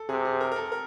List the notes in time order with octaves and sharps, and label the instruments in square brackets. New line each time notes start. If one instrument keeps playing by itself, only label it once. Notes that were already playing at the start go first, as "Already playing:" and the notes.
Already playing: [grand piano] A4
[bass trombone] C3 [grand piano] G#4
[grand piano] G#4
A#4
A#4
A4
A#4